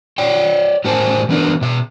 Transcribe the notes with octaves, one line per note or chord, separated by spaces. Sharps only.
C#5 D5 G5
A2 G4 A#4 C5 G#5 A5
E3 A3 B3 D4 A#4 B4
B2 E5